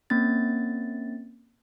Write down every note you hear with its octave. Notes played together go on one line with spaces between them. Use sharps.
A#3 C4 C#4 A6